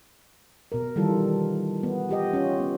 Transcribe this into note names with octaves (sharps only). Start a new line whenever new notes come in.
B2 A#4
D#3 E3 G3 F4 A4
B3
F4 G4 D#5
C#4 F4
B3